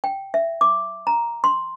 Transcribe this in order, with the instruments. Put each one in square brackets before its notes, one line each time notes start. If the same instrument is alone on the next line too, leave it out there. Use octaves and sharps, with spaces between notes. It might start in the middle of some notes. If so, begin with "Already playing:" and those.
[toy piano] G5
E5
D6
A#5
C6